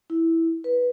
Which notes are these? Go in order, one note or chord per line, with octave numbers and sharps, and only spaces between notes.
E4
B4